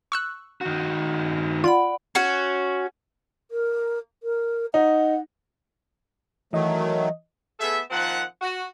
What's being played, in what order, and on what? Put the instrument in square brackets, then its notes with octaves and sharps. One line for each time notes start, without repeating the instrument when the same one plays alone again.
[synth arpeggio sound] C#6 E6 F#6
[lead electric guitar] D#3 F#4
[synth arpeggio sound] F4 [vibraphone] D5 F#5 B5
[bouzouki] C#4 F#4
[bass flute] A#4
A#4
[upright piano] D#4 [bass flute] F#5
[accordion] D#3 F#3 A3 [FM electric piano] E3 D#5
[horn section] A3 B3 G#4 A4 E5
A#2 D#3 F3 C4 F#5
F#4